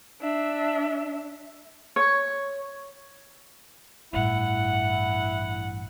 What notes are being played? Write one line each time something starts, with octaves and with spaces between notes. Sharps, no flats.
D4 E5
C#5
A1 G2 E4 F#5